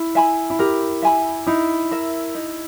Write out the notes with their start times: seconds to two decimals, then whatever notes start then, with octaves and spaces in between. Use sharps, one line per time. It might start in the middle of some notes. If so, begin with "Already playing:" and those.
Already playing: E4
0.15 E5 G#5 B5
0.50 E4
0.59 G4 A#4
1.02 E5 G#5 B5
1.47 D#4 E4
1.91 A#4 E5
2.35 D#4